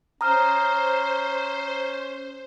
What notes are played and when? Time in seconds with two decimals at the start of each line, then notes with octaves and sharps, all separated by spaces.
0.21 C#4 C5 A#5 D#6 F6